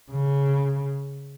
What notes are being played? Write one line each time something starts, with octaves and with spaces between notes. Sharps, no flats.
C#3